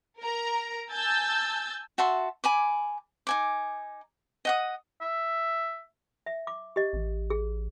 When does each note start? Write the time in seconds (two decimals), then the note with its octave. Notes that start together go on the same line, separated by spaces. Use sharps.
0.21 A#4 A#5
0.92 G#5 A5 E6 G6 A6
1.98 F#4 E5 A5 C6
2.44 G#5 B5 D6
3.27 D#4 G#5 D6
4.45 D#5 F#5 D#6
5.01 E5
6.26 E5
6.47 D6
6.76 G4 D#5
6.93 A1
7.30 G#4